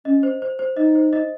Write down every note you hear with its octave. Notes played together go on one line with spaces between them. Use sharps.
C#4 D#5
C5
C5
C5
D#4 D#5
C5
D#5